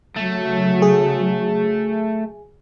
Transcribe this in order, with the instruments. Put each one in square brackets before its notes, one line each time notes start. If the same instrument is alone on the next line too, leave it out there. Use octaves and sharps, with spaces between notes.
[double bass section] C#3 F#3 [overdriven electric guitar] A3
[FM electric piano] G#4